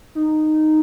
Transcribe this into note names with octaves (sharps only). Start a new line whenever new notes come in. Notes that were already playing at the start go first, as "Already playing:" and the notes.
D#4